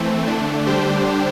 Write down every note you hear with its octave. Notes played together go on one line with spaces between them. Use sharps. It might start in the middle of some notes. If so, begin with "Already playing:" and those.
Already playing: E3 A3 C4
D3 A3 D4
D3 G3 D4 G4 C5